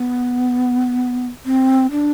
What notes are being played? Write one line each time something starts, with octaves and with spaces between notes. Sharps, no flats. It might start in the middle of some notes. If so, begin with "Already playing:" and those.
Already playing: B3
C4
D4